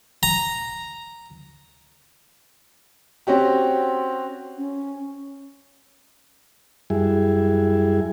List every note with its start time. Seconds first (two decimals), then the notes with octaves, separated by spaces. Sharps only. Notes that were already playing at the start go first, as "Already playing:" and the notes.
0.23 A#5
3.27 C4 C#4 F#4 G4
4.57 C#4
6.90 F#2 G3 E4 G#4